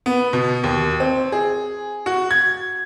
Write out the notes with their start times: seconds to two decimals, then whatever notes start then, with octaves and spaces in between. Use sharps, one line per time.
0.06 B3
0.33 B2
0.64 D#2
1.00 C4
1.32 G#4
2.06 F#4
2.31 G#6